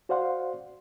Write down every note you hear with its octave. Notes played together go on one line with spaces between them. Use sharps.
F#4 C5 D5 F5 F#5 C6